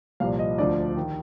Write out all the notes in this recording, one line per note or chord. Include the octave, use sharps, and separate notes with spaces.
C2 A#2 F3 F5
D#5
D2 D3 F3 D5
D#3